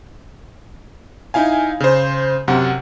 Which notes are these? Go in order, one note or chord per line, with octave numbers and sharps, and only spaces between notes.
D#4 E4 F5 G#5
C#3 C5
F#2 C3 F#5